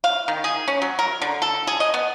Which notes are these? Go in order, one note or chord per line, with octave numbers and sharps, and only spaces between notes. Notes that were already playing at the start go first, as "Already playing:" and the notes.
F5
D#3
G#4
C#4
F#3
A#4
D3
A4
G#4
D#5
B3